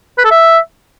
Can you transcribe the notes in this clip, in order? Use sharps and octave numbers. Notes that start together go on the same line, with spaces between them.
B4
A4
E5